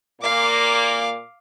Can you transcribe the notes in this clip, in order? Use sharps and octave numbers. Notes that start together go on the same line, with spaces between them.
A#2 A#3 F5 D6